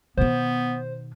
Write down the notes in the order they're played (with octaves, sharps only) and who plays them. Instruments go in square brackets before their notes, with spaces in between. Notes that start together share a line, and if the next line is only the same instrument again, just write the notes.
[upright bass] B2 D#3 [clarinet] B3 [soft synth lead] C5